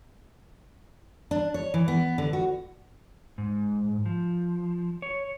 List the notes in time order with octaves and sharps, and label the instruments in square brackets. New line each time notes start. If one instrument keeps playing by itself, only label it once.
[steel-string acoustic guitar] D4
C#5
E3
B3
D3
F#4
[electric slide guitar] G#2
F3
C#5